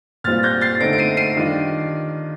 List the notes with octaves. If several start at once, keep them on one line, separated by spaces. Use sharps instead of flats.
A#2 G3 C4 F4 F6 A6
G6 A#6
A6 C7
D3 A3 C4 D#4 A#6 D7
D7
C7 D#7
C7 D#7
D#3 G3 D4 F4